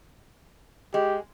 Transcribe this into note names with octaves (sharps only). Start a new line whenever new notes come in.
G#3 G4